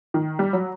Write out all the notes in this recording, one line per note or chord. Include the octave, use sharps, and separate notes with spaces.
D#3
G3
F#3